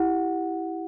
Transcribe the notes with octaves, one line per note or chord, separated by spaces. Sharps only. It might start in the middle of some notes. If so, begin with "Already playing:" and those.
Already playing: E4 G4 F#5